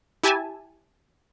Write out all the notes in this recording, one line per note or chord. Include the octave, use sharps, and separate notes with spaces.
E4 G4 E5 G#5 A5